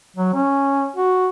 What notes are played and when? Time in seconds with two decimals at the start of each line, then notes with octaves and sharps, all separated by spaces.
0.16 F#3
0.34 C#4
0.96 F#4